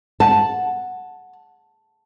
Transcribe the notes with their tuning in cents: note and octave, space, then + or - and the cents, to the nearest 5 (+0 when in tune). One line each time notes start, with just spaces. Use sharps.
F#5 -5 A5 +0